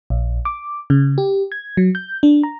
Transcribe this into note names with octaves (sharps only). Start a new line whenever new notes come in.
A#1
D6
C#3
G4
G#6
F#3
G6
D4
A#5